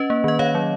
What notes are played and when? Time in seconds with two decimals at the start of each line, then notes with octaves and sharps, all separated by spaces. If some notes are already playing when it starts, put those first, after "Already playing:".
Already playing: C#4 B4 D#5
0.10 A#3
0.24 D#3 D#5
0.39 D#3 C#5 F5
0.55 F#3